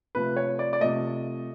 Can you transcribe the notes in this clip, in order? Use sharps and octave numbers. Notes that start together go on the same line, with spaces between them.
C3 F3 A3 B4
C#5
D5
D5
C3 F3 A3 D#5